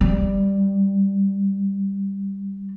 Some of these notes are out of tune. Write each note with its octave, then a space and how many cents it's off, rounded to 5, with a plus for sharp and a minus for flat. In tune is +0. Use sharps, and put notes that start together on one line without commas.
G3 +5